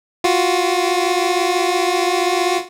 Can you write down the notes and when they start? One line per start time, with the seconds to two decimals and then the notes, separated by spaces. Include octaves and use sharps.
0.24 F4 F#4